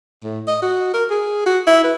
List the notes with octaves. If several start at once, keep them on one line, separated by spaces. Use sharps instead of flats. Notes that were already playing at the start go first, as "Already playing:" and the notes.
A2
D#5
F#4
A#4
G#4
F#4
E4
B4